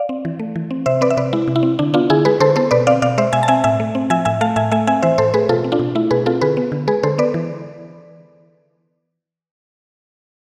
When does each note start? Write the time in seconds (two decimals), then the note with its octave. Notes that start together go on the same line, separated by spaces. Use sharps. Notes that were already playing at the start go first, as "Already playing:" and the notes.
Already playing: D5 F5
0.09 C4
0.25 E3
0.39 A3
0.56 E3
0.71 C4
0.86 C3 C5 E5
1.01 C4 B4 D5
1.10 E5
1.17 C3 B4 D5
1.33 G#3 E4
1.48 C3
1.56 E4
1.63 C4
1.79 D3 D4
1.94 B3 D4 F4
2.10 D3 E4 G#4
2.25 G#3 G#4 B4
2.40 D3 A4 C5
2.56 B3 A4 C5
2.71 B2 B4 D5
2.87 C4 D5 F5
3.02 B2 D5 F5
3.18 G#3 C5 E5
3.33 B2 E5 G#5
3.43 A5
3.48 C4 E5 G#5
3.64 A2 E5 G#5
3.80 A3
3.95 C4
4.10 F3 E5 G#5
4.25 A2 E5 G#5
4.41 A3 F5 A5
4.56 A2 E5 G#5
4.71 A3 E5 G#5
4.87 C4 E5 G#5
5.02 E3 C5 E5
5.18 A2 A4 C5
5.34 A3 G#4 B4
5.49 B2 F4 A4
5.64 C4
5.72 D4 F4
5.79 B2
5.95 A3 E4
6.11 B2 G#4 B4
6.26 C4 F4 A4
6.41 D3 G#4 B4
6.57 B3
6.72 D3
6.88 G#3 G#4 B4
7.03 D3 A4 C5
7.18 B3 B4 D5
7.34 E3